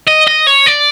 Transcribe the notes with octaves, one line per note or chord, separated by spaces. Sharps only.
D#5
D#5
C#5
D5